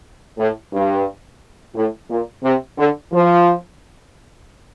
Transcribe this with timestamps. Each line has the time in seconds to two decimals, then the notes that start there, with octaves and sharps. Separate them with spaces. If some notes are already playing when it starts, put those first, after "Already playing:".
0.38 A2
0.72 G2
1.75 A2
2.09 A#2
2.43 C3
2.77 D3
3.12 F3